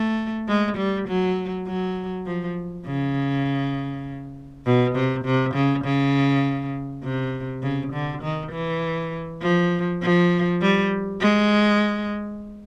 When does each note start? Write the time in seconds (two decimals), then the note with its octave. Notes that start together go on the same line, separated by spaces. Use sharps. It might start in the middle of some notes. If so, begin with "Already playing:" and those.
Already playing: A3
0.48 G#3
0.77 G3
1.08 F#3
1.67 F#3
2.26 F3
2.86 C#3
4.66 B2
4.95 C3
5.25 C3
5.55 C#3
5.84 C#3
7.03 C3
7.63 C#3
7.93 D3
8.22 D#3
8.52 E3
9.42 F3
10.02 F3
10.62 G3
11.21 G#3